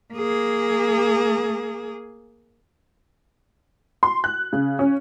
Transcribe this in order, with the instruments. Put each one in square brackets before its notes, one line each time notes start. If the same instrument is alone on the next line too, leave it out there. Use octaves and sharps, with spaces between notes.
[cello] A#3 G#4
[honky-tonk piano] C6
F#6
C#3
C#4